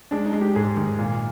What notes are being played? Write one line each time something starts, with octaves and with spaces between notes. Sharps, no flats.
G#3 D4
D#4
G#3
G4
G#2 G#4
D#3
A#2